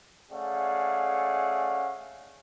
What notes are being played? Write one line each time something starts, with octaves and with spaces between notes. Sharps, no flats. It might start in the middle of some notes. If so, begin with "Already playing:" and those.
A3 C#4 G#4 D5 F5 F#5